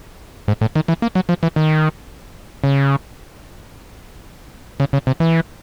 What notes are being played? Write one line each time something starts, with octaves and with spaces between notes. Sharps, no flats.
G#2
A2
D#3
E3
A#3
F#3
F3
E3
D#3
C#3
C#3
C#3
C3
E3